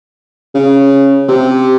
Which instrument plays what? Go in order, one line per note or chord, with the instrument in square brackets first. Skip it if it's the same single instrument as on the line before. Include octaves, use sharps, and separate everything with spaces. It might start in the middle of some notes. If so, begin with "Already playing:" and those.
[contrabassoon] C#3
C3